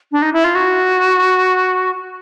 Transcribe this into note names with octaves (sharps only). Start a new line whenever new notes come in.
D4
D#4
E4
F4
F#4